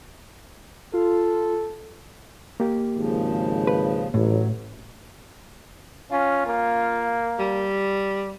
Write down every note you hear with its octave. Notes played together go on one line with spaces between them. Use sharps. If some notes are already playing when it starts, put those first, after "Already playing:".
F4 A4
A#3 G4
G#1 C#3 F3
B4
A1 A2 F#3
C#4 F4
A#3
G3